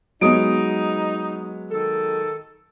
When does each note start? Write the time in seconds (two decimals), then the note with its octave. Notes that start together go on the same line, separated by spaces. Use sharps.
0.21 F#3 G#3 B3 D#4 D#6 D7
1.72 D#3 A4